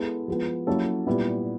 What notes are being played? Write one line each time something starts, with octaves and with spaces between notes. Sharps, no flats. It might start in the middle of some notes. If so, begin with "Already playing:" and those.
Already playing: G#3 B3 E4 A4
F3 G#3 B3
F#3 A#3 C#4 E4 A4
A#2 G3 B3 E4